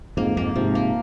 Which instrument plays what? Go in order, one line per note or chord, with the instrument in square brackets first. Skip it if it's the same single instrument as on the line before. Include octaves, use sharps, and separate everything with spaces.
[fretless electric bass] F2 G#2 [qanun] A#3
[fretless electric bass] F2 G#2 [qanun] A#3
[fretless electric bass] G#2 C3 [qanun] F3
[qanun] A#3